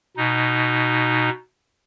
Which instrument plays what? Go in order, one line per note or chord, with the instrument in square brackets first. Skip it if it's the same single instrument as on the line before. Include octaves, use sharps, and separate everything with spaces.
[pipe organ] B2 D#4